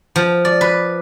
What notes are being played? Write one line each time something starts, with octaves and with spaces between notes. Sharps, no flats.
F3
D5
B4